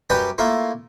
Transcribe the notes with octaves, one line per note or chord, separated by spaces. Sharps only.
F#2 G3 G4 B4 D5 G5
A3 A#3 E4 F4